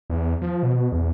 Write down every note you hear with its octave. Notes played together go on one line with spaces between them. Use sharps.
E2
F3
B2
E2